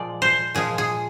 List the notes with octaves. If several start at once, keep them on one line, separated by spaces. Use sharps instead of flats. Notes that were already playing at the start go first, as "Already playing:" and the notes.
Already playing: A#2 F3 G#3 D5
C5
A#2 F3 G#3 G#4
G#4